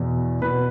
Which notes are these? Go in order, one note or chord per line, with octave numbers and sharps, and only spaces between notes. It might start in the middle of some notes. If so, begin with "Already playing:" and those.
Already playing: E2 B2
B2 B4